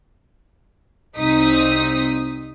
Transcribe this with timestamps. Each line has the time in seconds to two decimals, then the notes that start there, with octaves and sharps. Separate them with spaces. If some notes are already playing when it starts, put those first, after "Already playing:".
1.17 C2 C4 D#4 D#6 B6